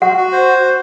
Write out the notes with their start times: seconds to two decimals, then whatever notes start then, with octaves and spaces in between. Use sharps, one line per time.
0.02 F#4 F#5
0.17 F#4
0.32 C5